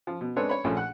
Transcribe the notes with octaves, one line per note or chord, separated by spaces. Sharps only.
F3
B2
G#3 C4 D4 A4 B4 C#5
C#5 B5
A#1 F3 A3 C#4
F#5 F#6